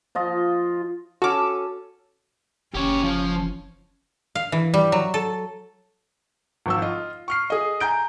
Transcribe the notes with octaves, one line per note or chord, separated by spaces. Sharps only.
F3 F4 D#5
C#4 F#4 A4 D6
F#1 C#4 G4 C#5
F3
F5
E3
G3
F#3
A4
G#1 F3 E6
F4 D#5
C#6 F6 C7
G#4 D#5
G#5 A#5 G6 D7